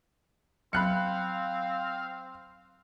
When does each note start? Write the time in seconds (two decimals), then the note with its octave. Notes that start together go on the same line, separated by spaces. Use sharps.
0.73 F#3 C4 F5 B5 F#6 C#7